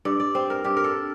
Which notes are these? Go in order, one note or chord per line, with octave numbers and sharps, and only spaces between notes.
G2 D5
D5
C4 C5
A#4
G2 G4
A#4
A4